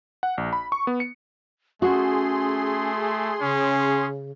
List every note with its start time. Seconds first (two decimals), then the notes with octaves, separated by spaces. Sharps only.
0.23 F#5
0.38 A#1
0.53 B5
0.72 C#6
0.87 B3
1.00 C#7
1.82 A3 C#4 F#4 G#4 C6
3.41 C#3 C#4